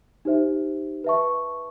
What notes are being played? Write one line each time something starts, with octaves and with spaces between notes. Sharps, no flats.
D#4 G4 C5 E5
B4 E5 A5 C#6